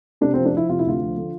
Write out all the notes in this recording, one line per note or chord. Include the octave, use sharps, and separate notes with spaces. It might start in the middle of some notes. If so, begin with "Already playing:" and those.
C3 D4
F3 C4
D4
F3 E4
C3 F4
E4
D2 F4
F3
D3